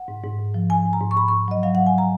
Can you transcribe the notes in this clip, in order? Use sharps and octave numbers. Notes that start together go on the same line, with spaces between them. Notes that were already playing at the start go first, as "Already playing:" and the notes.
Already playing: F#5
G#2
G#2
G#2
F3
F3 G#5
G#2
A#5
G#2
C#6
G#2 B5
G#2 C#6
F#3 D#5
F#3 F5
G#2 F#5
G#5
A#5